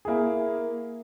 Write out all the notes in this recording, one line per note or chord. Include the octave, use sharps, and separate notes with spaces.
A#3 E4 G#4